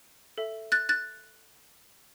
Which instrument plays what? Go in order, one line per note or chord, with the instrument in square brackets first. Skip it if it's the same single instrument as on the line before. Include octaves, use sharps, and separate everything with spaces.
[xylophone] A4 E5
F#6 A6
F#6 A6